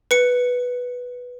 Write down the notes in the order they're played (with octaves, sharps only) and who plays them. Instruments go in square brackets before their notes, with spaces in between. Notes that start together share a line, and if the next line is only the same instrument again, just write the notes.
[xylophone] B4 C#7